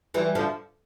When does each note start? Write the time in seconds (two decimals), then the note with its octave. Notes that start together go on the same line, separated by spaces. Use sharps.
0.14 E3 G3
0.35 D3 F3